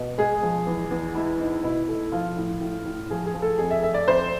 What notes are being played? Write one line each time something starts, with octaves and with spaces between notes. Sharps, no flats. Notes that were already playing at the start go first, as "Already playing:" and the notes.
Already playing: B2
G#3 G#4
F3
E2
E2
G#3 E4
G#2
B2 E4
A3
F3 F4
A2
A2
A2
F3 G#4
G#4
F3
A4
F2 G#4
E5
A3 E5
D5
F2 C5